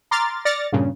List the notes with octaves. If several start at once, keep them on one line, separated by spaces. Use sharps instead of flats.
A#5 C6 D6 F6 A6
D5 F6 A6 A#6 C#7
G2 A#2 C#3